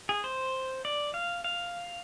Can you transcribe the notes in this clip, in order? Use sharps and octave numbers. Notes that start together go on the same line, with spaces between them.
G#4
C5
D5
F5
F5